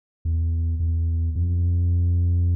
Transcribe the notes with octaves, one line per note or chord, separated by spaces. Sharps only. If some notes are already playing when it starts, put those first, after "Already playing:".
E2
E2
F2